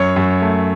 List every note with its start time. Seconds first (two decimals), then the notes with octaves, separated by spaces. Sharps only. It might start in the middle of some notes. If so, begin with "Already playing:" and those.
Already playing: F#2 C#5
0.16 F#2
0.42 A3